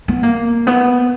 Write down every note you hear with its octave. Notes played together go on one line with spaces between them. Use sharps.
B3
A#3
B3